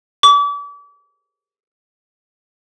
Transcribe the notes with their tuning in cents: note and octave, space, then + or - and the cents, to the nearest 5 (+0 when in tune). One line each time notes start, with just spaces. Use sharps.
D6 -40